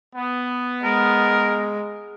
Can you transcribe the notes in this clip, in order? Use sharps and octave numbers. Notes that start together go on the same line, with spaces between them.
B3
G#3 A#4